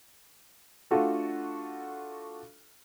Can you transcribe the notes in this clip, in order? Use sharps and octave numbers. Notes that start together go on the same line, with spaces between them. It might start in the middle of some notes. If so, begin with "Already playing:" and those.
A3 D4 F4 F#4 A4